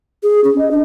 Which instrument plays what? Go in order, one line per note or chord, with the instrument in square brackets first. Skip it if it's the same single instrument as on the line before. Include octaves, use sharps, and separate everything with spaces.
[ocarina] G#4
C#4
D#5
D4